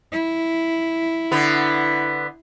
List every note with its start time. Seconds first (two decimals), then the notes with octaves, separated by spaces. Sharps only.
0.12 E4
1.32 D3 B3